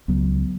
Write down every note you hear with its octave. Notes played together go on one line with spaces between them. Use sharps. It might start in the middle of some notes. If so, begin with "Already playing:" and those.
C#2 F#3 B3